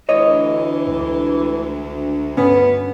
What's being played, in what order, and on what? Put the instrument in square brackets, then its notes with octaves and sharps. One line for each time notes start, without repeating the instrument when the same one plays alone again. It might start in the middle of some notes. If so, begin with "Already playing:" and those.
[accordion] D2 [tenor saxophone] E3 [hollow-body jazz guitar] C#5 D#5
[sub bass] C#2
[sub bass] G2 [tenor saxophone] B3 [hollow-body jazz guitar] C#4